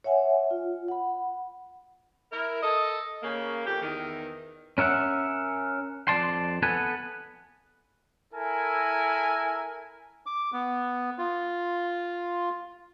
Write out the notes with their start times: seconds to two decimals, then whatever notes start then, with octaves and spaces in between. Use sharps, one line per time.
0.04 C#5 E5 F#5 G#5
0.51 F4
0.88 F#5 B5
2.32 E4 A#4
2.63 A4 D#5
3.22 C#3 A#3
3.66 F2 G4
3.82 E2 D#3
4.78 C#4 A#4 E5 F#5
6.08 F2 D5 A5 C6
6.63 B3 A4 B4 G#5
8.33 E4 A4 A#4 G#5
10.26 D6
10.53 B3
11.18 F4